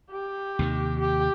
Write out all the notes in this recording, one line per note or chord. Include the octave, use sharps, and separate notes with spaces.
G4
D#2 C3 D#3
G4